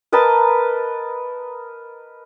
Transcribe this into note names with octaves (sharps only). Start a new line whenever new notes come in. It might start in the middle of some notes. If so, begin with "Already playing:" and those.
A#4 B4 D#5 A5